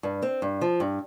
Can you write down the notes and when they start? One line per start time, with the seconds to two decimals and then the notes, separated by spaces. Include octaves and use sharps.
0.03 G2
0.22 C4
0.42 G2
0.61 F3
0.80 G2